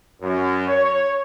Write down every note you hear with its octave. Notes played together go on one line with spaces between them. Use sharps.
F#2
C#5